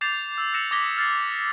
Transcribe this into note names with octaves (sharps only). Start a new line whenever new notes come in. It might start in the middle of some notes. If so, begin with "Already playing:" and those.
D6 G6 A6 C7 E7 F7
E6
E6 F#6 A#6 C#7 E7
D6 D#6 G#6 A#6 B6 G7
F6 A6 C7